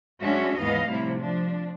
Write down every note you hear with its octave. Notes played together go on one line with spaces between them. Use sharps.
F#2 G#3 C#4 D4 F#4 E5
D#2 G#2 E3 B3 D#5 F5
A2 C3 F3 G3 E4
F3 D4